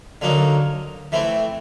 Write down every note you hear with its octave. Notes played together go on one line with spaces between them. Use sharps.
D3 F#3 A#3 D#4
E3 A3 C4